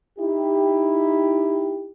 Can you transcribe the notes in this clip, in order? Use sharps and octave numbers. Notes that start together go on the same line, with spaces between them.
D#4 E4 G4